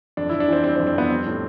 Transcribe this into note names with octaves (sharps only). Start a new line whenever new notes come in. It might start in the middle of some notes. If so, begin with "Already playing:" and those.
F2 D4
F2 E4
D4
E3 C4
G3 C4
C4
F2
C4
F2 B3
G3 C4
A2